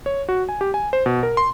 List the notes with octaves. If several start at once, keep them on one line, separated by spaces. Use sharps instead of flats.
C#5
F#4
G#5
G4
G#5
C5
B2
A#4
C6